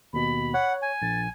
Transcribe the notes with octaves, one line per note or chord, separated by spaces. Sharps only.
D#2 B2 B5
C#5 F#5
G#5
A#1 A6